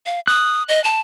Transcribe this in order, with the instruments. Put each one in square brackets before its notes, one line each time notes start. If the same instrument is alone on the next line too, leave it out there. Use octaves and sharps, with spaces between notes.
[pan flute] F5
[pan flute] D#6 [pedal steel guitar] F#6
[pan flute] D#5
A5